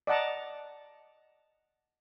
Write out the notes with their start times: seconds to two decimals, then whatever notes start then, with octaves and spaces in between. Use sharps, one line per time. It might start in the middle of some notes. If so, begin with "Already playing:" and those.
0.07 D5 D#5 F#5 A5 A#5